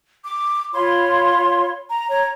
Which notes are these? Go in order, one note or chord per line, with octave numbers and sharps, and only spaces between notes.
D6
F4 C#5 B5 C6
A#5
C#5 A#5